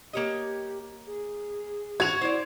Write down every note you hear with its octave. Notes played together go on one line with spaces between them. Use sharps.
A#3 G4 C#5 D#5
G#4
F#4 G#6 F7
E4 C5 D5